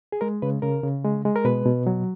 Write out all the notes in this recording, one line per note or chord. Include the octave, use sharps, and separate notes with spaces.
G#4
G#3 A#4
C#3 B4
C#3 A#4
C#3
G#3
G#3
A#4
B2 B4
B2
F#3